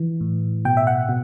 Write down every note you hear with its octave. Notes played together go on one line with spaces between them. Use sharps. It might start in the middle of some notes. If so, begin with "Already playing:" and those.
Already playing: E3
A2
B2 G5
E5
F#5
B2